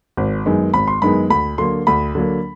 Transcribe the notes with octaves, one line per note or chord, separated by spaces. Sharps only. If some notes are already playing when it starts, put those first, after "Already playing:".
G#1
F#2 D#3 G#3 B3
G#1 B5
C6
F#2 D#3 G#3 B3 B5
D2 B5
D3 F#3 A#3 C6
D2 B5
D3 F#3 A#3